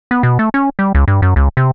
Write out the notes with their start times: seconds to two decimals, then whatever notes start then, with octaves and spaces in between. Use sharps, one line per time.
0.11 B3
0.23 B2
0.39 A3
0.54 C#4
0.79 G3
0.95 C#2
1.08 G2
1.22 F#2
1.36 C#2
1.57 C3